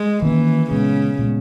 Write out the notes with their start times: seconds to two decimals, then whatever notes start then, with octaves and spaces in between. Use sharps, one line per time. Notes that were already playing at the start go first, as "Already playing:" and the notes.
Already playing: G#3
0.22 D#3 E3 G3 A#3 C#4
0.70 A#2 C#3 G#3 B3
1.19 A#2 G#3 B3